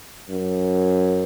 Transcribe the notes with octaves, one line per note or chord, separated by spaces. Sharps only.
F#2